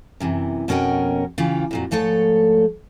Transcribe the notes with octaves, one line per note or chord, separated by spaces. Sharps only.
F#2 C3 E3
F2 B2 C#4 A#4 F#5 G5
C#3 E3 F4 G4
F2 A#2 F#3
G#2 F3 A3 A4 C#5